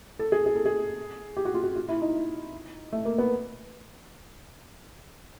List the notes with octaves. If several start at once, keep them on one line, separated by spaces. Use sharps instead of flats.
A4
G#4
G#4
A4
G#4
G4
F#4
F4
F#4
F4
E4
D#4
A3
A#3
B3